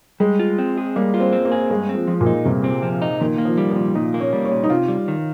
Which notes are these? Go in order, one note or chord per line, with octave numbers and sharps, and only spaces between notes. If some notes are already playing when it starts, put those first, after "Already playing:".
G3 G#3
F4
C4
G#4
G3 A#3
F4
C4
C4
A#3
G#4
G2 G#3
C4
F3
F3
A#2
D#4
G2 C3
C4
F3
D#4
A#2 D#3
A#3
F3
G3
F3
A#2
A#2 D#4
A#3
C#4
G3
C#4
A#2
D#4
C3 F4
G3
D#3